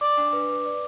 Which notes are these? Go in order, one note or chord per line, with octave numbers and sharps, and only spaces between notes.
D5 D6
D4
B4
B4
D5